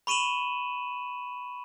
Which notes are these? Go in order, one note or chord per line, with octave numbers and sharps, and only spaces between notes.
B5 C#6 D#7 E7 F#7